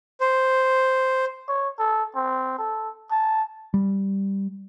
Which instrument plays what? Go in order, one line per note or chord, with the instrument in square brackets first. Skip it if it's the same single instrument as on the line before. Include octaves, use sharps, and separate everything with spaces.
[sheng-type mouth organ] C5
[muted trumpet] C#5
A4
C4
A4
A5
[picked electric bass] G3